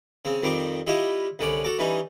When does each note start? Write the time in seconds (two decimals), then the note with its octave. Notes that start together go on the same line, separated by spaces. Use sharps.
0.25 C#3 C4
0.42 F2 D#3 G3 C4 D6
0.87 G3 E4 F4 G4 D#5 E5
1.39 C2 D3 C#4 D5 B5
1.64 F#4 A4 A#5 D6
1.79 E3 G3 C#4 D#4